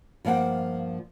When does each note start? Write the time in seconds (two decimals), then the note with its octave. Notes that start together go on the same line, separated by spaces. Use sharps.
0.25 G2 F3 A#3 F#5 G5